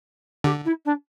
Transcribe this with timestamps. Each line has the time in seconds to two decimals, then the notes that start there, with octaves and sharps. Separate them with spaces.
0.44 D3 G4
0.65 E4
0.85 D4